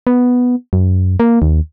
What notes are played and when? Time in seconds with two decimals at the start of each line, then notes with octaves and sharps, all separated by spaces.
0.07 B3
0.73 F#2
1.20 A#3
1.42 D#2